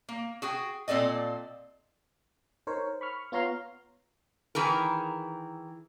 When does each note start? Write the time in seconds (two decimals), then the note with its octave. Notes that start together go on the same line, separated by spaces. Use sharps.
0.09 A#3
0.42 F#4 G#4 G5
0.88 A#2 C4 A4 D5 D#5
2.67 D#4 A#4 C5 C#5
3.01 B5 C#6 F6
3.32 B3 F4 C#5 A#5 C6 F6
4.55 D#3 E3 G#4 A#4